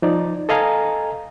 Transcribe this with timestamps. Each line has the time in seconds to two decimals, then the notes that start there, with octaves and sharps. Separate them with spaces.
0.02 F3 D#4 D5
0.49 A4 D#5 F5 G#5 A#5